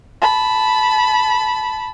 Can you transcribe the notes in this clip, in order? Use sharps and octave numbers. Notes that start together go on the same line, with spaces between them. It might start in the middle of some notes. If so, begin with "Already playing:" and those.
A5 B5